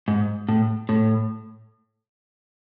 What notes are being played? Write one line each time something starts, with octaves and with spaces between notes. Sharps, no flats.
G#2
A2
A2